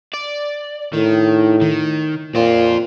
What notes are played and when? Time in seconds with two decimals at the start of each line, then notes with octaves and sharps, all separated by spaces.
0.14 D5
0.94 A2 D#3
1.62 D#3
2.35 A#2 C4 F4